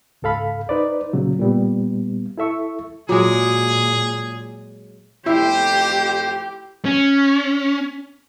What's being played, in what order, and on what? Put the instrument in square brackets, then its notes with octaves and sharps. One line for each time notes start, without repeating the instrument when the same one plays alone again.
[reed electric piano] C#2 G#2 A4 F5 B5
D#4 B4 C5 D5
A#2 C#3 F#3
A#2 G3 B3
E4 A4 E5 C#6
[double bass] A#2 [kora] F#3 G#3 [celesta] F4 D6 [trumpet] G#4
[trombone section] F2 A3 [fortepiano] E4 [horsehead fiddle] G4 [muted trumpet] C5
[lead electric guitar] C#4